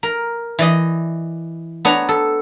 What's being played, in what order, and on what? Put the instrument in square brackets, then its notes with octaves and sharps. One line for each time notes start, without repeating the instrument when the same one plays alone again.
[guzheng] A#4
E3 D5 D#5
B3 D4 C#5 A#5
A4